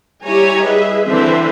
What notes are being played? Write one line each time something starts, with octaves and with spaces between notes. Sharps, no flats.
G3 E4 G4 C#5 G#5 A#5
G#4 B4 D#5 E5
D3 E3 C4 B4 C5 E5